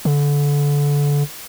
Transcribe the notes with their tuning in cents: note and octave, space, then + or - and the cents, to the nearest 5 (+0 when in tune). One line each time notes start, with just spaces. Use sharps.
D3 -25